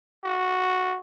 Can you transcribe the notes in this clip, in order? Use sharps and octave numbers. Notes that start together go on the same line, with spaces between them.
F#4